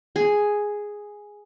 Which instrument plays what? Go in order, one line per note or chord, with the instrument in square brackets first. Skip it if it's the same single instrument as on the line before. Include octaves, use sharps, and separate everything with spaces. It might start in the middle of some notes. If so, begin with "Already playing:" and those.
[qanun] G#4